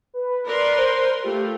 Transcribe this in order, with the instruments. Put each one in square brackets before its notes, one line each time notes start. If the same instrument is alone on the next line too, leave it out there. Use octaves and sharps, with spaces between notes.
[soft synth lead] B4
[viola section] A#4 B4 C6 [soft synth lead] D5
[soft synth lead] C5
[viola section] A3 F4 [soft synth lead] G4